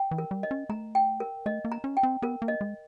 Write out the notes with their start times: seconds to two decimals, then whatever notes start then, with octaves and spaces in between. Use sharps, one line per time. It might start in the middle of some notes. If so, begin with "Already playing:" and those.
Already playing: G5
0.11 E3
0.18 A#4
0.31 G3
0.43 D#5
0.51 C#4
0.69 A3 A#5
0.95 G5
1.20 A#4
1.46 A3 D#5
1.65 A#3
1.72 A#5
1.84 C#4
1.97 G5
2.03 C4
2.22 B3 A#4
2.42 A#3
2.48 D#5
2.61 G#3